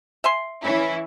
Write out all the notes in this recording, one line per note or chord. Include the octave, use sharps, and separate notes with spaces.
E5 G#5 C6
E3 C#4 E4